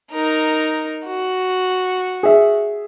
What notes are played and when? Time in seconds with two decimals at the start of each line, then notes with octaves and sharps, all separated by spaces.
0.12 D#4 A#4
1.06 F#4
2.23 G#4 E5